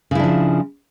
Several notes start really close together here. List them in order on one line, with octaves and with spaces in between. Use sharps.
C#3 E4 D4 F3